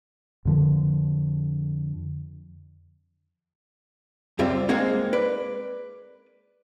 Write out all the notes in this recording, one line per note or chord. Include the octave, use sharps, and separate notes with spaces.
F2 D3 F3
C#2 F#2 G3 C4 F4 E5
G#3 A#3 C4 D#4 G#4
B4 D5